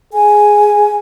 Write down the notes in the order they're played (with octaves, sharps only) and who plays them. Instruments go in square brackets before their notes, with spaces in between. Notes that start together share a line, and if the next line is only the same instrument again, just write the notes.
[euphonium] G#4 [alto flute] G#5